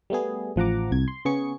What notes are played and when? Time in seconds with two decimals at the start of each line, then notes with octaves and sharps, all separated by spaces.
0.10 G3 A3 B3 G#4
0.56 A1 F3 F#5 A#5 D6
0.91 C2 G#6
1.08 C6
1.25 C#3 B3 G#4 C#6 C#7